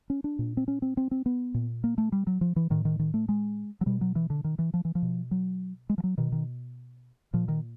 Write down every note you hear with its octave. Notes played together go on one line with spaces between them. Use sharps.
C#4
D4
A#2
C4
C#4
C4
C4
C4
B3
A#2
A#3
A3
G3
F#3
F3
E3
A2 D#3
D#3
D#3
A3
G#3
F#3
B2 G3
F#3
E3
D3
D#3
E3
F3
E3
F3
B2
F#3
G#3
F3
F#3
B2 D#3
D#3
A#2 F3
D#3